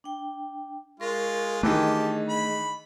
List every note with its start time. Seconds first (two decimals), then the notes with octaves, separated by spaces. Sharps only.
0.04 D4 G5
1.00 G#3 F4 A#4 C#6
1.63 D#3 E3 A3 D4 G4 G#4 D#5 A5
2.29 B5